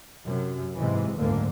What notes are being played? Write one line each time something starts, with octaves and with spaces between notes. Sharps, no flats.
F#2 C3
G#2 C3 E3 G#3
F#1 D2 G#2 D3 A#3